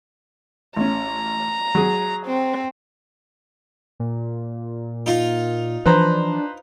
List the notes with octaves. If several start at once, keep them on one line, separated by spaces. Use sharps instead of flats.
A1 C#4 A#5
F#3 G#4
C4
A#2
D#4 F4
E3 F3 D4 B4 C5 A#5